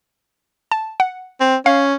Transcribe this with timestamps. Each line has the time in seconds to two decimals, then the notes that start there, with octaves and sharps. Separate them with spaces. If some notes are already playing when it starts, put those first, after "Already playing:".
0.72 A5
1.00 F#5
1.41 C4
1.66 C#4 F5